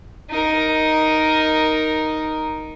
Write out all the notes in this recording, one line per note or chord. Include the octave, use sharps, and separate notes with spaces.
D#4 A#4